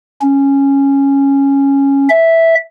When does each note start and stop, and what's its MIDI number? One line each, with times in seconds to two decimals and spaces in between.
0.21 2.08 61
2.09 2.55 76